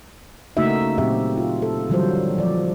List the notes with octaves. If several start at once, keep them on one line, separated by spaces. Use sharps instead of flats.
C#3 A3 A#3 D#4 F#4 E5
A#2 F#3 C4 G4 E5
F4
A4
D3 E3 F#3 G3 F4 C5
F3 D5